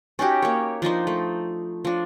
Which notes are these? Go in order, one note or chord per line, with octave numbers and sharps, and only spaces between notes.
C#4 D#4 F#4 G4
A#3 C#5
F3 D4 D#4 C5
A3
F3 D4